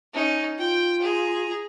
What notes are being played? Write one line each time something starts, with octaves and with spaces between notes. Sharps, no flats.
C#4 D#4
F4 G5
G#4 A#5